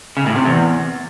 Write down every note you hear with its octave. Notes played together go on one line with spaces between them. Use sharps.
C#3
A2
C3
E2